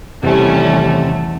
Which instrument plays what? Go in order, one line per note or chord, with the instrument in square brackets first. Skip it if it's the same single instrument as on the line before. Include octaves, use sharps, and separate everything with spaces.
[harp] E2 [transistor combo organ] C3 [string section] D#3 G3 C#4 [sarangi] A3